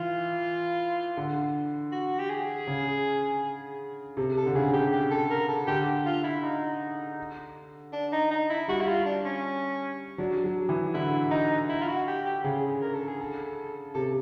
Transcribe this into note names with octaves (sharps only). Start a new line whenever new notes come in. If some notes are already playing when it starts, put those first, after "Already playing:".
Already playing: E3 F4
D3
F#4
G4
G#4
C#3
C3 A4
A4
D3
C#3 G#4
G4
G4
A4
A#4
A4
D3 G4
F4
E4
D#4
D4
D#4
D#4
E4
G3 F#4
E4
F4
D4
C#4
F#3 D4
F#3
E3
D3 E4
D#4
E4
F4
F#4
G4
G4
C#3 G#4
A#4
A4
G#4
A4
C3 A4